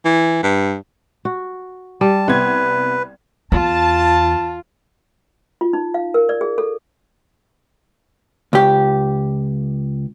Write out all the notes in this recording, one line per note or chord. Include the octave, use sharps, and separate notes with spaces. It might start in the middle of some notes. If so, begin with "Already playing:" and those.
E3
G2
F#4
G3 A5
C2 B3 B4 C5 G#6
E2 F4 A5
F4
D#4
F5
A#4
D5
G#4
A4
C#2 G4